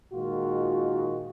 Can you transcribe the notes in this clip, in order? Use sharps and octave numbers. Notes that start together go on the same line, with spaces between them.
A#2 D#3 G#3 F4 F#4